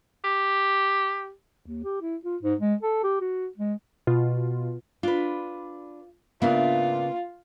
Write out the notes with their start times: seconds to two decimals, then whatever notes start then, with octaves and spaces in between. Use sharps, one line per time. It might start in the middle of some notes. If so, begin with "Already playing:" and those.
0.24 G4
1.67 D#2
1.84 G4
2.02 E4
2.25 F4
2.43 G#2
2.61 G#3
2.82 A4
3.04 G4
3.21 F#4
3.57 G#3
4.07 B2 F4
5.03 D4 F4 B4
6.42 G#2 C#3 A#3 B3 D4 F4 E5